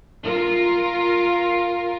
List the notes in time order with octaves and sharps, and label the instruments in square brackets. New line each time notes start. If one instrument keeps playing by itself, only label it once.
[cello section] F4 A#4